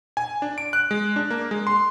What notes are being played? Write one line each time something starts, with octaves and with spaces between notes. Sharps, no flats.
G#5
D4
D7
F#6
G#3
D4
A#3
G#3
C6